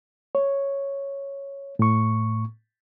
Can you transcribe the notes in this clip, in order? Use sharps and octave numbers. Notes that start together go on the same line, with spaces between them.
C#5
A2 C#6